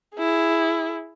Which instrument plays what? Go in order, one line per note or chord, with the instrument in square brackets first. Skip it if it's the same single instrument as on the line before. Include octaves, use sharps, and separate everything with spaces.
[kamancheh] E4 G#4